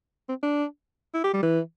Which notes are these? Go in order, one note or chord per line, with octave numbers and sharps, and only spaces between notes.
C4
D4
E4
G4
G3
E3